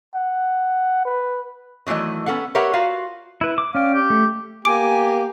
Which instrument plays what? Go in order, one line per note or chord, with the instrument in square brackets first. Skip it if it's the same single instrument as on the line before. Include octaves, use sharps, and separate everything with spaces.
[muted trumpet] F#5
B4
[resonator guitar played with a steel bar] D#3 E3 F#3 A3 D#5
B3 C#4 A4 F5 F#5
G4 A#4 B4 C#5 E5 F#5
F4 F#4 F5
[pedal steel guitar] E4 B4
D6
[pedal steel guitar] C#4 D5 G5 [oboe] F5
[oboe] G4
[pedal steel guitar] A3
[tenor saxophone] A#3 [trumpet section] B3 G4 [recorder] G#5 [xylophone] D6 D7